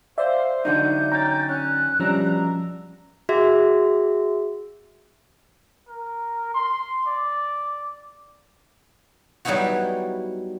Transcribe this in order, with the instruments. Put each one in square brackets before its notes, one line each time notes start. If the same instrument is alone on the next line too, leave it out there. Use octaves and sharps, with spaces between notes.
[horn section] C5 [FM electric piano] D5 E5 [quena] F5
[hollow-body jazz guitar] D3 F#3 D#4 [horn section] D4 [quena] G6
[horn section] C#4 G5 [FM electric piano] A#5 A6
[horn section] C#4 [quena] F#6
[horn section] B2 E5 A#5 [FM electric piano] F3 C#4 [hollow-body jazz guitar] G3 D4
[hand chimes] F#4 G#4 E5
[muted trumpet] A#4
C6
D5
[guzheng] F#3 G3 B3 D#4 E4 F#4